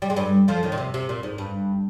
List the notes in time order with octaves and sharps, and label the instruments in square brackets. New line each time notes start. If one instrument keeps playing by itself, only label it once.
[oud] G3
G#3
G2 G3
F2 F3
D#2 D#3
A#2
C3
C3
A#2
G#2
G2